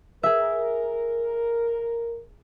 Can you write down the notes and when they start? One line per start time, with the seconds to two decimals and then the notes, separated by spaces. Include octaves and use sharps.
0.23 G#4 A#4 E5